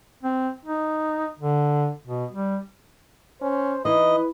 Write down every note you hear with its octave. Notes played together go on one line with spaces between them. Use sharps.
C4
D#4
D3
B2
G3
C#4 C5
E3 D#4 B4 D#5